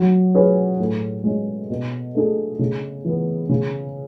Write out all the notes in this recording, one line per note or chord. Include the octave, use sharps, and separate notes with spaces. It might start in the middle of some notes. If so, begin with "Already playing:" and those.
Already playing: F#3
C#4 G#4 B4
A2
G#3 C#4
B2
A3 D4 G#4
C#3
E3 B3
C#3